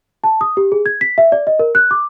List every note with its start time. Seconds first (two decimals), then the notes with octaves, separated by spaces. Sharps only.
0.24 A5
0.41 D#6
0.57 G4
0.72 G#4
0.86 G#6
1.01 B6
1.18 E5
1.32 D5
1.47 D#5
1.59 A#4
1.75 F#6
1.91 D6